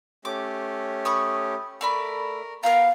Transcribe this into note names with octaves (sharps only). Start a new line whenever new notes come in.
A3 C#4 G4 D6
B5 C#6 D#6
A3 A#4 D5 B5
B3 A#4 F5 G5 A#5